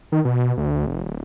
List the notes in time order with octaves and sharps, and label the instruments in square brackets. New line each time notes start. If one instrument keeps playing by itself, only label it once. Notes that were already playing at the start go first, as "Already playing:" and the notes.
[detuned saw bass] D#3
B2
D2
F1
D1